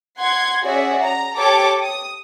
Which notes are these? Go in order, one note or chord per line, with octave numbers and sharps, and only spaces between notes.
F#5 C6 G#6
C#4 F#4 G#4 D5 E5
A#5
G4 A4 C#5 A5 D6
D#6